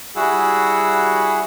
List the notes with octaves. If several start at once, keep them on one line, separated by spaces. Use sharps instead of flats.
G3 E4 F#4 G#4 F#5 E6